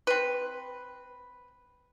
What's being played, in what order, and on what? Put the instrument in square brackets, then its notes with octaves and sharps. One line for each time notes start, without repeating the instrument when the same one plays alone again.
[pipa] C4 B4